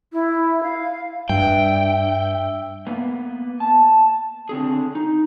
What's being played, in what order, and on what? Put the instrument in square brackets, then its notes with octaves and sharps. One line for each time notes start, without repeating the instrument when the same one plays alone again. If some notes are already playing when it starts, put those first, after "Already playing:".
[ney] E4
F5
[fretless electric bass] G2 [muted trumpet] E5 [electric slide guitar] G5
[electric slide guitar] A#3 B3
A5
D3 C4 G#4
D#4